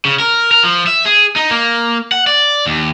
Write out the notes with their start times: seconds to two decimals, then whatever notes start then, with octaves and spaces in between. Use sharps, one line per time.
0.05 C#3
0.20 A#4
0.52 A#4
0.64 F3
0.87 E5
1.06 G#4
1.36 D#4
1.51 A#3
2.12 F#5
2.27 D5
2.66 D#2